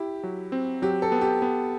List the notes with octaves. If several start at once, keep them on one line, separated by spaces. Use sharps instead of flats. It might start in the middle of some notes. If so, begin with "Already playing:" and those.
Already playing: E4 G4
F#3
C4
F#3 G4
A4
B3
G4
B3